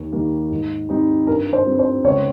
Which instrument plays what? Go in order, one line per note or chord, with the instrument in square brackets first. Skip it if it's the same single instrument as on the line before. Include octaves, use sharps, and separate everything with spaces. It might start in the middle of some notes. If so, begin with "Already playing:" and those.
Already playing: [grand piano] D#2
D#3 G3 A#3
G#2
G3 C4 D#4
[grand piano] G2 [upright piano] A#4
[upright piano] C5
[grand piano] G3 C4
[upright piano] C5
[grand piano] C#2 [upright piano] C#5